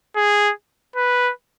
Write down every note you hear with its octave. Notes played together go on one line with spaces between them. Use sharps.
G#4
B4